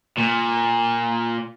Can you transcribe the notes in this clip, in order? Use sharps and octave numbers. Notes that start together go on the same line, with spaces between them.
A#2